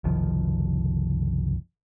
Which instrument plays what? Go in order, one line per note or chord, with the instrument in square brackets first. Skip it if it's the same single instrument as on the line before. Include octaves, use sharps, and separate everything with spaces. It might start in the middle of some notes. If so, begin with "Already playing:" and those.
[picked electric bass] F#1 C2 D#3 F3